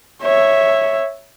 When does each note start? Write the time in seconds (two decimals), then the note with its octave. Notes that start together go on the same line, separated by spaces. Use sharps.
0.23 C#5 E5